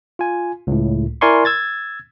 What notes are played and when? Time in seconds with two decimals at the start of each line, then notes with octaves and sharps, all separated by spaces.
0.19 F4 G#5
0.67 C#2 A2
1.21 E4 A#4 D5 G#5 C6 C#6
1.45 E6 G#6 A6